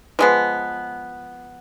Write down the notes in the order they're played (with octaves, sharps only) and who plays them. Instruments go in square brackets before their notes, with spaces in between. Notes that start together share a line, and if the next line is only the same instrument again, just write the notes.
[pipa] F3 G#3 B3